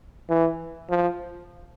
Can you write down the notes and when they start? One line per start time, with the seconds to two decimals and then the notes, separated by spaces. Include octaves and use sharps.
0.29 E3
0.89 F3